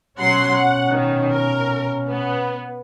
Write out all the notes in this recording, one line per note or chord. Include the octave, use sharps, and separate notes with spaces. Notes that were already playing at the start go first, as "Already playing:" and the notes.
B2 F#3 C#4 F#5 C6
F#5
D#3
A#4
B3